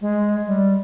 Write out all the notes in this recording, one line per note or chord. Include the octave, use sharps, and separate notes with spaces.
G#3
G3